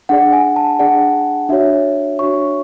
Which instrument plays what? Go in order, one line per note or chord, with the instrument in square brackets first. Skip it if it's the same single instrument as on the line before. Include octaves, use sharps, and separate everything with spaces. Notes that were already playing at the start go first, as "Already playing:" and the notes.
[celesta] D4 G#4 D5 F#5
G#5
A5
D4 G#4 D5 F#5
D4 F#4 C#5 E5
D4 F#4 C#5 C#6